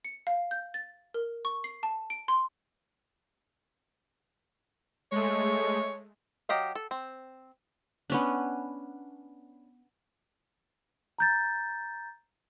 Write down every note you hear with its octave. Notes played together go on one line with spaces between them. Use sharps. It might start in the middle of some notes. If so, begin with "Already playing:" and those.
C#7
F5
G6
A6
A#4
C#6
C7
A5
D7
C6
G#3 A3 C#5
F#3 G4 D#5 F5
A4
C4
B3 C#4 D4
A#5 G6 A6